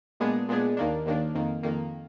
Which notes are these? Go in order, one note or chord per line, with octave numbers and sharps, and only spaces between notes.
A#2 G#3 B3 D4 G#4
A#2 G#3 B3 D4 G#4
D#2 D#3 A#3 D4
D#2 D#3 A#3 D4
F2 D#3 A#3
F2 D#3 A#3